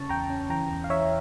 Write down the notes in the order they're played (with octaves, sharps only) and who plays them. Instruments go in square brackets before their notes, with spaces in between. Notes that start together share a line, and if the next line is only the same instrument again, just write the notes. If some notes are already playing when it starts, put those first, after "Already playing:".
Already playing: [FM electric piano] C#3 C#4 A5 C#6
E2 G5 A#5
C#4
E3 G5 A#5
E2
F5
E3 C#5 E5